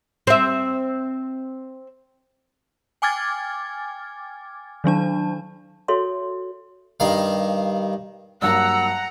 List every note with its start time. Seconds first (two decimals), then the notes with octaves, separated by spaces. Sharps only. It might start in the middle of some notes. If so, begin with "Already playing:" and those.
0.27 C4 E5
3.02 G5 G#5 D6 F6 G#6 A6
4.84 D#3 F#3 D4 A5
5.88 F#4 A4 C#5 E5 C6
7.00 G2 D#3 F5
8.42 G2 F#3 A#3 F#5 A#5 E6